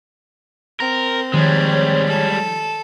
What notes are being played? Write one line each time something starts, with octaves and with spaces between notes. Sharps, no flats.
C4 A#4
D#3 F3 G3 G#3 C#5
A4